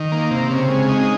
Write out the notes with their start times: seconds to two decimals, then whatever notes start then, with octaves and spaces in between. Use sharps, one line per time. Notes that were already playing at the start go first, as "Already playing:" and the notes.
Already playing: D#3
0.12 A#3
0.31 C3
0.50 C#3 C4
0.70 G#3
0.89 D#4